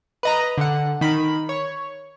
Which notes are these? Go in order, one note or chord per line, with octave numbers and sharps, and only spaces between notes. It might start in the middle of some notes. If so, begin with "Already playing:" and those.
B4 D#5 A#5
D3 F#5
D#3 B5
C#5